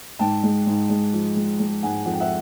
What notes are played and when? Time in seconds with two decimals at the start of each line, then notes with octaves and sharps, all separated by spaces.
0.19 G#2 G5 A5
0.43 G#3
0.66 G#2
0.89 G#3
1.13 F3
1.36 G#3
1.59 G#3
1.83 G#2 F#5 G#5
2.05 F2 F#5
2.13 G5
2.20 E5 F#5